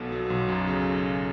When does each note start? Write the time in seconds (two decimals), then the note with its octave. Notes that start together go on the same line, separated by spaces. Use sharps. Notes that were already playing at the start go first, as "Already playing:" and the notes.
Already playing: B1 B2 A4
0.12 F#3
0.30 B1
0.49 F#2
0.67 C#3